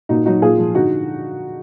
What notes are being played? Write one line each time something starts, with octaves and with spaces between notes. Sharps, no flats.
A#2 D#4 F#4
F#3 D#4 F#4
A#2 F4 G#4
F3
D3 D#4 F#4